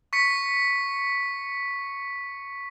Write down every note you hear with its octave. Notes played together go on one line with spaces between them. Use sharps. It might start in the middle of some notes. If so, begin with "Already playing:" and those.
C#6 B6 C#7